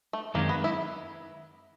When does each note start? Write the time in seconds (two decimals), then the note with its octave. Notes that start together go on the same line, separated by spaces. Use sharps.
0.13 A3
0.34 F#2 D#3 G#3 A#3 C4
0.49 B3
0.64 E4